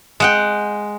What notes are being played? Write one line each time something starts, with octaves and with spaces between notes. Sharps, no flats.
G#3 F#5 G5